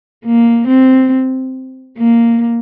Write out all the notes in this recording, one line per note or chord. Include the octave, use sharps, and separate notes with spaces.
A#3
C4
A#3